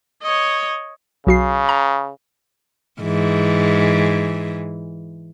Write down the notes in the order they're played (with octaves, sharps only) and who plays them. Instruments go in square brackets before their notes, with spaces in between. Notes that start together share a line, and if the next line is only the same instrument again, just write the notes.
[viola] C#5 D#5
[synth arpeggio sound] B1 F#4 C7 [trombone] C#3
[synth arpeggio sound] A#5
[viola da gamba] G#2 E3